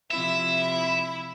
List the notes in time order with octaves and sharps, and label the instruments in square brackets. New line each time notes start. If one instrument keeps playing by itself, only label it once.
[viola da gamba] C3 F3 C4 [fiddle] E4 [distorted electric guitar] E5